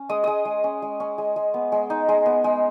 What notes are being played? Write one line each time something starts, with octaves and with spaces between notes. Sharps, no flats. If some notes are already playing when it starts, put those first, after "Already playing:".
Already playing: C#4
G#3 D#6
G#3 D#6
G#3
C#4
G#3
C#4
G#3
G#3
B3
G#3
D#4
G#3
B3
G#3